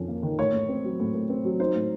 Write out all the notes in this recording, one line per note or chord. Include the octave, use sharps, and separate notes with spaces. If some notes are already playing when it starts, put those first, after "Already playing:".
Already playing: F2 D#3 C#4
A#3
D#3
A2 C#5
A2
C4
F#3
A2
A2
C4
F#3
D#4 C5
A2